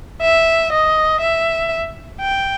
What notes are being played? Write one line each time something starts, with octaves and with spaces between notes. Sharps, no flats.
E5
D#5
E5
G5